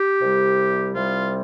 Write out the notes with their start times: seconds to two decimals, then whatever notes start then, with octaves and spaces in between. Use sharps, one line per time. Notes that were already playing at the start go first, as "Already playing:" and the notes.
Already playing: G4
0.21 C2 C3 G3
0.93 C2 C3 G3 F4